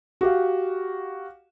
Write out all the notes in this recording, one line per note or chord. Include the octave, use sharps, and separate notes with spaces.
F#4 G4 F5